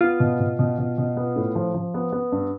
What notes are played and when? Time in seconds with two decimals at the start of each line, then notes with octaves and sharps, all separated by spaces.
0.01 B3 F4
0.20 B2
0.40 B2
0.59 B2
0.79 B2
0.98 B2
1.17 B3
1.36 A2
1.55 F3
1.74 F3
1.94 B3
2.12 B3
2.32 G2